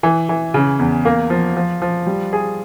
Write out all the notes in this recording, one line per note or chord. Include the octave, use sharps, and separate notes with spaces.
E3
E3
C#3
E2
A#3
F3
F3
F3
G3
G#4